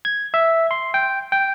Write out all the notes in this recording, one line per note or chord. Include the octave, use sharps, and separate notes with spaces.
G#6
E5
C6
G5
G5